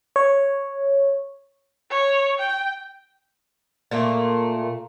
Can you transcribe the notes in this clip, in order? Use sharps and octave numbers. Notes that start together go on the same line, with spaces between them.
C#5
C#5
G5
A#2 A3 A#3